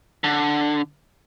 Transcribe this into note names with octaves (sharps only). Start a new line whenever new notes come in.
D3